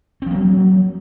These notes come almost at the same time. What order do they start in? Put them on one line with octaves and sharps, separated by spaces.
C4 F3 A#3 F#3